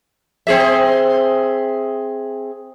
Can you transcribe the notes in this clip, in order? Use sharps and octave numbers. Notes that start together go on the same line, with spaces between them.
C4 G#4 E5